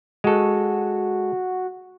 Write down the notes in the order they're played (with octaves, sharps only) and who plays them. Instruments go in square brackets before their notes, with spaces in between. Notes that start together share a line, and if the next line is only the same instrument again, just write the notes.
[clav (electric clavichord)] G#3 A4 [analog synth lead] F#4